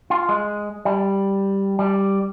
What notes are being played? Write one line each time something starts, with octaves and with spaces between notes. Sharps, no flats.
F4
G#3
G3
G3